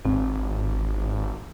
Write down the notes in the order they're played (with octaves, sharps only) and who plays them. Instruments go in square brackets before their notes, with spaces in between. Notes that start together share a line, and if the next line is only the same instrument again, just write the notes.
[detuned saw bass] G#1 [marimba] C4